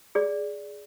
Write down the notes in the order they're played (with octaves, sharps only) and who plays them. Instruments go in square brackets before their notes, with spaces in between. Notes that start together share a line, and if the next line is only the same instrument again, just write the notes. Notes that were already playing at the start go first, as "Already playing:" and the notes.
[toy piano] G#4 D5